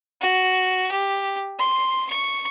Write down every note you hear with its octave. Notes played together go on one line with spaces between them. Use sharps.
F#4
G4
C6
C#6